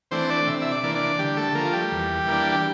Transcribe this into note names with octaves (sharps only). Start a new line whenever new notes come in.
E3 A3 C4 D4 C5
D4 D5
C3 E5
E4 E5
D4 D5
E3 A#3 D4
C5
D4 D5
D3 G3 G4
A3 A4
F3 A3 A#3 A#4
F4
G3 G4
E2
E3 A#3 D4
G4